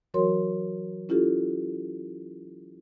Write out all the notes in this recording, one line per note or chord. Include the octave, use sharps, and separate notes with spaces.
E3 F#3 F#4 A#4 C#5 C6
C#4 E4 F4 G4 A4